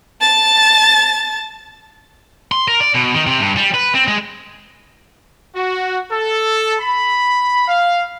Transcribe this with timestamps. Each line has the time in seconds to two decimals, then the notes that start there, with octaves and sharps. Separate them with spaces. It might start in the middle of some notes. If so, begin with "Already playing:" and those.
0.21 A5 A6
2.52 C6
2.68 A#4
2.80 D5
2.95 B2
3.14 D#3
3.26 C3
3.40 G2
3.57 G3
3.74 B4
3.95 C4
4.08 G#3
5.55 F#4
6.10 A4
6.80 B5
7.66 F5